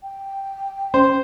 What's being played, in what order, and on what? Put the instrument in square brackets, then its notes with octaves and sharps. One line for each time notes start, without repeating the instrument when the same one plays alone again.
[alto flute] G5
[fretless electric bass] C#4 [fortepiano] C5